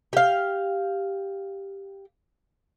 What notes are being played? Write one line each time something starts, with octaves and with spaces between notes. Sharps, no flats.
G4 F5